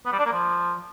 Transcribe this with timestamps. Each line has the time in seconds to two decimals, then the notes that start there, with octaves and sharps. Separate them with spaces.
0.06 B3
0.12 G3
0.19 D4
0.26 A#3
0.32 F3